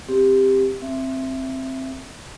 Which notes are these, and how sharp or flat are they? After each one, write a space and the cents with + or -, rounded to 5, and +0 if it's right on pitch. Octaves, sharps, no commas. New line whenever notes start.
C4 +0 G4 +10
C4 +5 E5 +10